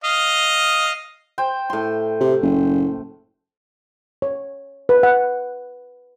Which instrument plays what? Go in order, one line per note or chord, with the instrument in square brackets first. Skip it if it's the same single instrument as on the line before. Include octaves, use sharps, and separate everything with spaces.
[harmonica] D#5 F5
[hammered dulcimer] C5 G5
A2 C6
[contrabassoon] C3
F#1
[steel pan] C#5
B4
F#5